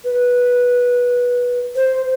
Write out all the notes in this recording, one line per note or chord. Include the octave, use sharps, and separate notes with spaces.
B4
C5